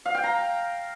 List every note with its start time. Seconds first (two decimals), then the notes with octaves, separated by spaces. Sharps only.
0.06 F5
0.15 G5
0.24 A#5